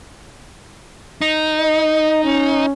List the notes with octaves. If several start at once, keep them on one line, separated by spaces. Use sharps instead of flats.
D#4
D#5
C#4